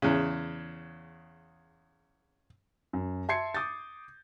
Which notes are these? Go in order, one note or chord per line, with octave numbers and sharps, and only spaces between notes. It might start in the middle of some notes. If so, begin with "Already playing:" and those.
E2 C#3
F#2
E5 A5 C6 G#6 C7 C#7
D6 D#6 G6 A6